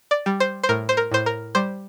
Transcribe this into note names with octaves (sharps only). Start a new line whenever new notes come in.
D5
G3
C5
C5
A2 A#4
C5
A#4
A2 C5
A#4
G3 C5